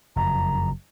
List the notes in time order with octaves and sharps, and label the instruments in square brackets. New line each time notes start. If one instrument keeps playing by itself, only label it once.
[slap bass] F#1 F2 [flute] A#5